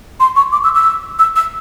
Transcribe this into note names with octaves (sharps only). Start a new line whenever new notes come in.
C6
C#6
D6
E6
E6
E6
E6